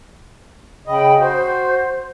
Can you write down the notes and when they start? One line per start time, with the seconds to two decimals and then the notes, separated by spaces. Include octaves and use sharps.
0.87 C#3 D#5 G5 B5
1.19 F#4 C5